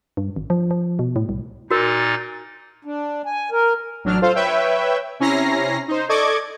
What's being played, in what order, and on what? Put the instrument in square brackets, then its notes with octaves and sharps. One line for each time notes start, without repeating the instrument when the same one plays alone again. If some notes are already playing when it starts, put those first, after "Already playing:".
[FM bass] G2
G#1
F3
F3
B2
A2
C2
[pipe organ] A#2 D#4 A6 [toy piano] F#4 A#4
[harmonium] D4
G#5
A#4
[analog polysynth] A1 F#3 D4 F6
F4 A4 C5 F5
B4 C#5 E5 G5
C3 C#4 E4 A#5 A#6 C7
D#4 C5
A4 D5 D#5 C#6 D6 G#6